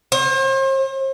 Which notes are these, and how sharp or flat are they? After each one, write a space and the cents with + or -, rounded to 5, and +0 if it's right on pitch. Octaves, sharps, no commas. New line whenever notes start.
C5 +40